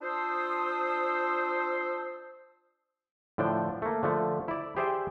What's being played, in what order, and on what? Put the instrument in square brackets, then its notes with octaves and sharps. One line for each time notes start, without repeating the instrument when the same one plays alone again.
[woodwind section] D4 F4 C5 [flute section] A5 D#6 E6
[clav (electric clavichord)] A2 D3 F3 D4 G5
A3 A#3
D3 F3 A3
E4 D5
G4 G#4 C5 D5 E5 G5